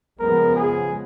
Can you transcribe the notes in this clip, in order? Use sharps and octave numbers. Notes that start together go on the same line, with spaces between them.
C#3 F3 G#3 B3 A#4
G#4